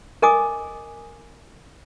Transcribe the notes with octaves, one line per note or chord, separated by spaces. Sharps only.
A#4 D#5 G#5 D6 D#6